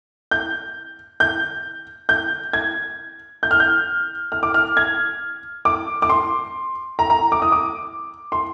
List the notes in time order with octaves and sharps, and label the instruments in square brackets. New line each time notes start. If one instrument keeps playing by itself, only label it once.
[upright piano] G6
G6
G6
G#6
G6
F6
G6
F6
D6
F6
G#6
D6
D6
C6
A#5
A#5
D6
D#6
D6
C6